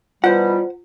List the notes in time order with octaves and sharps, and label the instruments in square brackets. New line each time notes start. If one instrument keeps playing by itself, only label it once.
[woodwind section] B2 E3 G3 [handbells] F4 [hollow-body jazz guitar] C5 F#5